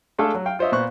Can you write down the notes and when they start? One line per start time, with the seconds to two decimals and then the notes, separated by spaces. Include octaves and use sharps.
0.19 G#3 A3 D4 G#4 A4 F5
0.34 F#3
0.46 F5 G5
0.59 F4 C5 C#5 D#5 E5
0.72 A#2 B3 C5 C#6 F#6